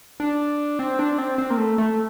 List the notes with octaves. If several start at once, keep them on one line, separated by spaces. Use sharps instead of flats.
D4
C4
D4
C4
C4
A#3
A3
A3